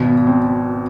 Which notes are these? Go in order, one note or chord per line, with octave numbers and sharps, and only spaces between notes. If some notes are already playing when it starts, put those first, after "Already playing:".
Already playing: G#1 B2
C4